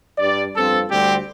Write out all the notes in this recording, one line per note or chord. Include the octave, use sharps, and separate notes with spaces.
G2 G3 D4 D5
G2 F3 C4 A4
D2 D3 G3 C4 G4